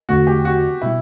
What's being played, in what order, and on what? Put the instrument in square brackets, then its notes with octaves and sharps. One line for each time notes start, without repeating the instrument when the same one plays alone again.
[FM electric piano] E2 D3 A3 [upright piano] F#4
[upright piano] G4
F#4
[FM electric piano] B2 G3 [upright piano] E4